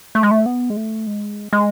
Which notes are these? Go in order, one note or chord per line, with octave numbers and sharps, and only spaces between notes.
A3
G#3
A3
B3
G#3
A3
G#3
G#3